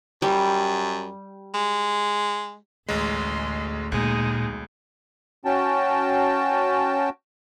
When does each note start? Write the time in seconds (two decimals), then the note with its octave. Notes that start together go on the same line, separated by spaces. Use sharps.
0.22 F#2 G3
1.54 G#3
2.89 A1 D2 G#3 C6
3.92 B1 A#2 G#3 D#4
5.45 C#4 F#4 G5 A5